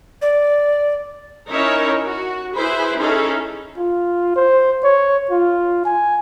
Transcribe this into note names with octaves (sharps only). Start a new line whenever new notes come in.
D5
C#4 D#4 E4 A#4 C#5
F#4
E4 G#4 B4 C5
C#4 D#4 E4 G#4 A4
F4
C5
C#5
F4
G#5